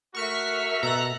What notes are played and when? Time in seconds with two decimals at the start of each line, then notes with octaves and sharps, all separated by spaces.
0.15 A3 F#4 A#4 E5 C#6 F6 B6
0.83 B2 A4 A#5 F#6